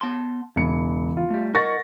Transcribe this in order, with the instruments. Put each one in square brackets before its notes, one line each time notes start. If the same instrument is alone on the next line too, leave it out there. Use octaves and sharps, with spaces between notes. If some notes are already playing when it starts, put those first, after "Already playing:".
[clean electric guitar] B3 A5 C6
[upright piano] E1 C#7 [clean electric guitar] C#3 E3
[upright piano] F4
[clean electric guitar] G3 A3
[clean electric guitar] A#4 D#5 F#5 [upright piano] C#6 A6 A#6